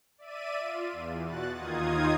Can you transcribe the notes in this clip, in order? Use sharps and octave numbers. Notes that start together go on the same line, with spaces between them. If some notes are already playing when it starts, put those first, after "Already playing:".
D5 E5 D#7
F4
E2
B2 F#4 F#6 A6
D#2 D#3 D#4 F4 D#6 G#6